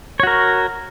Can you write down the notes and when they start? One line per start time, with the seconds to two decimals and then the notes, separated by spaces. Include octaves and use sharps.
0.20 C#5
0.23 F#4
0.27 A#4